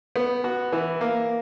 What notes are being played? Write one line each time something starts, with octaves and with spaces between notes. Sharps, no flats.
B3
F#4
E3
A#3